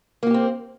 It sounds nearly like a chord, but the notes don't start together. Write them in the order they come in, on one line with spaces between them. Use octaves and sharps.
A#3 F#4 G4 C4